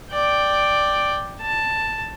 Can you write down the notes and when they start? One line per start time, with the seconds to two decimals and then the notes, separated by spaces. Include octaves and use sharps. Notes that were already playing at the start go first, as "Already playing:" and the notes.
0.12 D5 G5
1.41 A5